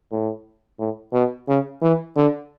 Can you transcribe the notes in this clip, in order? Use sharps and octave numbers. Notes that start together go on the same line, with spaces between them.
A2
A2
B2
C#3
E3
D3